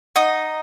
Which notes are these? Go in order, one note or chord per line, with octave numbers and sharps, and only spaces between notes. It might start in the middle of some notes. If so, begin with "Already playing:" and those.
D#4 D#5 F#5